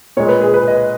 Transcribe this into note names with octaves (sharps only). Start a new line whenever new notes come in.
A#2 G#3 C#5
B4
G#4
B4
D#5